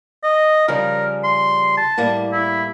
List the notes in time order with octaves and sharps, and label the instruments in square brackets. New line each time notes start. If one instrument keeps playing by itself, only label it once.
[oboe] D#5
[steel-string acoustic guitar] C#3 F3 G3 [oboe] A#4
[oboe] C6
A5
[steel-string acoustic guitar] A2 G3 A#3
[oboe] E4